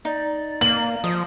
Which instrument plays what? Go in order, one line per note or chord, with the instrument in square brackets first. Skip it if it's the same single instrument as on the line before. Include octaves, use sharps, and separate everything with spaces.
[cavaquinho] D#4 [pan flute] D5
[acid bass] A#3 [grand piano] F#7
[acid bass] F3 [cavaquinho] D#5